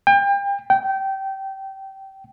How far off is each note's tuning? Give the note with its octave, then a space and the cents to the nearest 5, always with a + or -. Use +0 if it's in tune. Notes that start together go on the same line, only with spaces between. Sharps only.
G5 +35
G5 -20